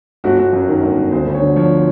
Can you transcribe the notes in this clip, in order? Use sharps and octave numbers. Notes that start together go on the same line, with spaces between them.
G1 F#4
G1
F#2
D#3
G1
G1
D2 C5
D2
C#5
D3
F3 C#5